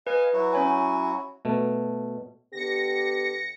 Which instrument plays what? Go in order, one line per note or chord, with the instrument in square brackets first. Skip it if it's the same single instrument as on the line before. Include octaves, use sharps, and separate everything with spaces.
[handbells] B4 [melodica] D#5 F5 G#5
[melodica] F#3 E4 F#4
[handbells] C#4 C#5 G#5
[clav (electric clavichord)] B2 A3
[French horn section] D3 B3 G4 [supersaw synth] A#6 C#7